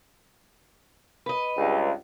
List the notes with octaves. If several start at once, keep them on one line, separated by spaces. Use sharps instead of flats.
B4 D#5
C#2 G2